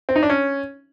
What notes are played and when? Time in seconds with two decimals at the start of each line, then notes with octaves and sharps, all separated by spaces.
0.09 C4
0.16 D#4
0.23 D4
0.30 C#4